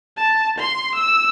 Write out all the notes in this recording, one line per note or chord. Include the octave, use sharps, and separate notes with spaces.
A5
C6
E6